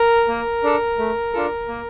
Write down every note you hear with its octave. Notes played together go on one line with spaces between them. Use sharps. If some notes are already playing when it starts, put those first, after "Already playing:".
Already playing: A#4
A#3
D4 A4
A3
D4 F4 A4
A#3